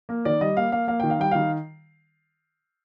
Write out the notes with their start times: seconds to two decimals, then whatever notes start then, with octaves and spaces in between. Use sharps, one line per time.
0.09 A#3
0.25 D#3 D5
0.41 G3 D#5
0.56 A#3 F5
0.72 A#3 F5
0.88 A#3 F5
1.00 D#3 G5
1.10 F5
1.19 G3 G5
1.31 D#3 F5